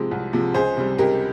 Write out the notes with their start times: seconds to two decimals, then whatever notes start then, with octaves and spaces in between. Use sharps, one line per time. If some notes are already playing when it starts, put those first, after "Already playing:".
Already playing: C3 F3 G#3
0.11 C2
0.33 C3 F3 G#3
0.54 C#2 G#4 C5
0.77 C3 G3
0.98 C#2 G4 A#4